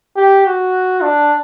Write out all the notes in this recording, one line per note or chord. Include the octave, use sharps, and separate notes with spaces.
G4
F#4
D4